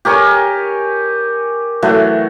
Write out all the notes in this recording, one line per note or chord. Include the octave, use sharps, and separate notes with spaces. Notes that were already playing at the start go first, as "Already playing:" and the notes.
G4 A#4 C#5 G#5
E3 F#3 A3